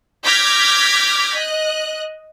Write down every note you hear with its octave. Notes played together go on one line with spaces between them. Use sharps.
D6 F6 G6 G#6 A#6 B6
D#5 F#6